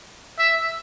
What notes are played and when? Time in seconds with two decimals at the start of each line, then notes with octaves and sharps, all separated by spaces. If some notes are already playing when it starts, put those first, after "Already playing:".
0.39 E5